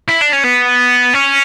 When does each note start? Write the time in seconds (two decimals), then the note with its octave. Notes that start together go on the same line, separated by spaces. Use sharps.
0.09 E4
0.22 D4
0.33 C#4
0.44 B3
1.14 C#4